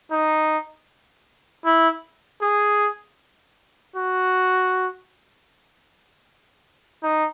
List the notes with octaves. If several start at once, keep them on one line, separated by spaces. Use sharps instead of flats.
D#4
E4
G#4
F#4
D#4